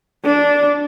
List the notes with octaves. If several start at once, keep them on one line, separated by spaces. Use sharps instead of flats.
D4